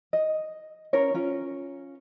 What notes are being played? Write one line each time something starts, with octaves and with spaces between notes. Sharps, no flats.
D#5
C#4 A#4 C#5
C#4 F4